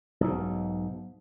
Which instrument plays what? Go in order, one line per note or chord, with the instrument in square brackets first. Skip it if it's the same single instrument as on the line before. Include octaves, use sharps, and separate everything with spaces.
[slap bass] B1 G#2